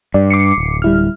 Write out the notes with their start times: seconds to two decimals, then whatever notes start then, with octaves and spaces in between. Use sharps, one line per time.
0.14 G2 D5
0.30 D6 C7 C#7
0.58 D1
0.82 G3 E4 F6